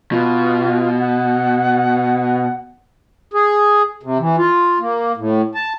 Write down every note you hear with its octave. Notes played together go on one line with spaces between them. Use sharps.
B2 F4
F#5
G#4
C3
E3
F4
A#3
A2
A5